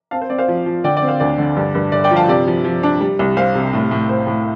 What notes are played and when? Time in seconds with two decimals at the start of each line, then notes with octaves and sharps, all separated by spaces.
0.11 C4 F5 A5
0.21 C5
0.30 C4 D5
0.38 C5 F5
0.48 F3
0.66 F3
0.84 D3 D5 G5
0.97 D5
1.02 C4
1.08 C5 F5
1.20 D2 D5
1.38 D3
1.56 G2
1.75 G2
1.92 G1 D5
2.04 D5 G5
2.11 F3
2.16 F5 A5
2.28 C3 D5
2.47 F3
2.64 F3
2.83 D4
3.01 G3
3.19 C2
3.37 G3 C5 F5
3.55 C3
3.73 A2
3.91 A2
4.09 A2 C5
4.27 A2